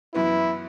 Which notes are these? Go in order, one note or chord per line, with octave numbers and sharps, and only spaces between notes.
F#2 E3 B3 E4